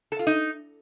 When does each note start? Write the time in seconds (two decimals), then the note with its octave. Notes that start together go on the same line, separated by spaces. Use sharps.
0.12 A4
0.19 F4
0.27 D#4